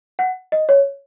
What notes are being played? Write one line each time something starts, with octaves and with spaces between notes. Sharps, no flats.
F#5
D#5
C#5